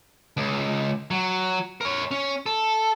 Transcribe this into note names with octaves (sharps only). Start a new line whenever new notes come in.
C#2
F#3
A#4 C#5
C#4
A4